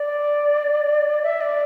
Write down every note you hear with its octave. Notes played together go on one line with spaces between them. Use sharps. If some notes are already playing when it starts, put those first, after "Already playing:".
Already playing: D5
E5
D5